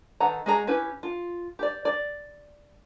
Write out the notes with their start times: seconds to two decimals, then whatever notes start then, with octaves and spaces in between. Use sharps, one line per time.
0.20 D#3 A4 B4 F#5 A#5
0.46 G#3 F#4 G#4 C5 A#5
0.67 C#4 E4 G4 B4
1.03 F4
1.59 G4 D5
1.85 D5